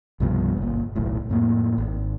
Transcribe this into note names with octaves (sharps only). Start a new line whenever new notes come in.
C2 G2 B2 F3
G1 A#2
D#1 B1 A2
F2 A2 A#3
G#1